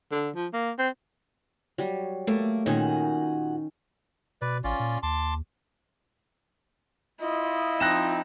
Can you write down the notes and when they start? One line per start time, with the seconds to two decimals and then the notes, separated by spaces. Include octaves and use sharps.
0.12 D3
0.35 F3
0.53 A#3
0.78 C4
1.78 F#3 G3
2.27 A3 A#3
2.66 A#2 D#3 C#4 D#4 F#4 G#4
4.42 B2 B4 D5
4.64 A1 C#4 F4 D5
4.80 A#2
5.03 D#2 A5 C6 D6
7.21 E4 F4 D#5
7.80 F3 C4 D#4 F#6 A#6 E7